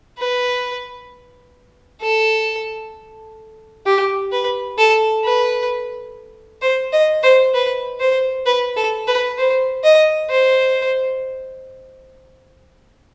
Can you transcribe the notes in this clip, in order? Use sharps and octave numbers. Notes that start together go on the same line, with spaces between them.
B4
A4
G4
B4
A4
B4
C5
D#5
C5
B4
C5
B4
A4
B4
C5
D#5
C5